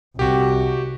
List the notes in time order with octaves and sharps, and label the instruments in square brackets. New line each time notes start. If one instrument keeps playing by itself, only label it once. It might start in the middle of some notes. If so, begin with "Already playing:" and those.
[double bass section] C2 [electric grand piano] F#4 G4